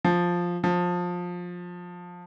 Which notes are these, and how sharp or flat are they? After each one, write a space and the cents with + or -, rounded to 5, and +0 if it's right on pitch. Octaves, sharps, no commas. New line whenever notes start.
F3 +5
F3 +20